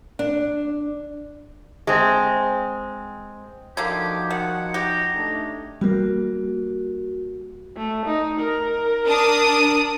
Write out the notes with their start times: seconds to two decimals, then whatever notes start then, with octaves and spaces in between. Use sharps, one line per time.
0.19 D4
1.87 G#3 C4
3.77 D3 F3 A#3 D#4 F#4 G4 G#6
4.30 D#3 F#5
4.74 G4 A#5
5.12 A3 D4 D#4
5.81 G3 A#3 F#4
7.77 A3
8.06 D#4
8.40 A#4
9.05 D4 D#6